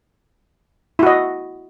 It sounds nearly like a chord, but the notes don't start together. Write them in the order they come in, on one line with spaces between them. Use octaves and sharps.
E4 F#4 D#5